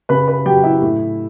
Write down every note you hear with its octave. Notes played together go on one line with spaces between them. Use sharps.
C#3 B4 B5
B4 B5
F#3 G4 G5
E4 E5
A2